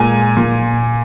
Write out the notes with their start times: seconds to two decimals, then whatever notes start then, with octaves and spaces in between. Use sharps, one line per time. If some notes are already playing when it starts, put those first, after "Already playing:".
Already playing: A#2 G#3 G#5
0.37 A#2